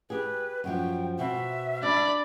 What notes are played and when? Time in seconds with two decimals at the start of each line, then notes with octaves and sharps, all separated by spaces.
0.10 G4 G#4 B4
0.64 F#2 F3 G5
1.19 B2 B3 C4 E5
1.83 D4 D5 B5